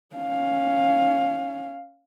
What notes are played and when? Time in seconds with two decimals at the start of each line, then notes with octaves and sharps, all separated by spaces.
0.16 C#4 F5